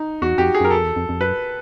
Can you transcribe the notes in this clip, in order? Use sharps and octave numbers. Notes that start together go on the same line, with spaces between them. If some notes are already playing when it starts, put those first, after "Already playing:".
Already playing: D#4
E2 F#4
F2 G4
G#4
F#2 A#4
F2 A4
E2
F2
F2
F#2 B4